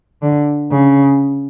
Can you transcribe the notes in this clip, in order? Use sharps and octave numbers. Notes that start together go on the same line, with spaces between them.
D3
C#3